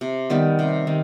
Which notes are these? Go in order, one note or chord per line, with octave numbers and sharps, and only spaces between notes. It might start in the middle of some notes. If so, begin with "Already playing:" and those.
C3
D#3 G3 B3
C3
D#3